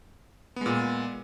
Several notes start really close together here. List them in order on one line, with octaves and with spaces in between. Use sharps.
B3 G#3 A#2